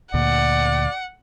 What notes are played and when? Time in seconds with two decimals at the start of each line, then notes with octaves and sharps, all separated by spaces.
0.14 D2 A#2 D5 F#5